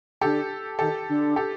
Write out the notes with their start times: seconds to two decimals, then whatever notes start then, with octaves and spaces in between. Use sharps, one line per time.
0.21 D3 G4 A4
0.79 D#3 G4 A4
1.08 D3
1.36 G4 A4